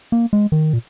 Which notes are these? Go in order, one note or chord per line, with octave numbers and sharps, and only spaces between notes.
A#3
G#3
D#3
A#2